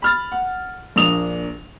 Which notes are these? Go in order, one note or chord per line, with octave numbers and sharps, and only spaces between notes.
B5 F6 A6
F#5
A#1 A#3 D4 D#6 F7